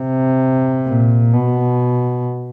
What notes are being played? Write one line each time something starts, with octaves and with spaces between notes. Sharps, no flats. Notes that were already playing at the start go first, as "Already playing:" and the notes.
Already playing: C3
A#2
B2